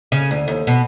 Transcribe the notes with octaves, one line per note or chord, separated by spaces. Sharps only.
C#3
D2
D#2
B2